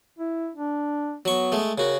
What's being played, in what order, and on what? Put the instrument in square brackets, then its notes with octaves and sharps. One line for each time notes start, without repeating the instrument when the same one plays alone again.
[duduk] E4
D4
[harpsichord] F#3 C#6 [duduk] B3
[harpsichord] G#3 A3
[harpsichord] C#3 F#4 [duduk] A#4